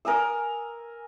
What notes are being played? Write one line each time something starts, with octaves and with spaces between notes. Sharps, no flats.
A#4 G#5 D#6 E6